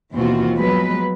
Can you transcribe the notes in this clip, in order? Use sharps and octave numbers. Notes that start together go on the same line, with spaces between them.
D#2 B2 E3 C4 F4 F#4
F3 F#3 G#3 B3 B4